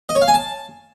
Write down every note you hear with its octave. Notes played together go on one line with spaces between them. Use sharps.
D#5
C#5
F5
G#5
A5